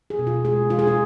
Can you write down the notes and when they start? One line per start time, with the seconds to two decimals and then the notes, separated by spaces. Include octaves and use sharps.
0.10 G#4
0.19 B2
0.27 F4
0.45 G#3 G#4
0.69 G#3 F4
0.79 G#4
0.87 F4